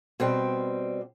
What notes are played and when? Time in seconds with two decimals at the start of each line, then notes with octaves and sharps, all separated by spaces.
0.20 B2 G3 C4